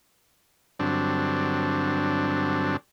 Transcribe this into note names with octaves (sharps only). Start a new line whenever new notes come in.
G2 D3 F#3 C4 D4